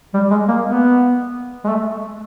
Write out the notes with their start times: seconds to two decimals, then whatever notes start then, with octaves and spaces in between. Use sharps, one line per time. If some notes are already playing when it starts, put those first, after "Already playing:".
0.14 G3
0.31 G#3
0.48 A#3
0.65 B3
1.64 G#3
1.68 A3